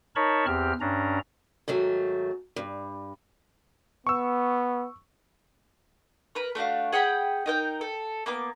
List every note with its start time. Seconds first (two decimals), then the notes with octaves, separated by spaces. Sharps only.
0.16 D#4 A#4 C#5 A5 B5 C#6
0.47 E2 C4 G4 F6
0.81 G2 C#4 D4 A#5
1.68 G#2 D#3 F#3 A3
2.56 G2
4.07 B3 C#6 E6
6.35 A#4 B4
6.55 A3 D4 F#4 F5
6.92 G#4 F#5 G5 B5
7.46 D#4 A#4 G5
7.81 A4
8.26 A#3 B3 D6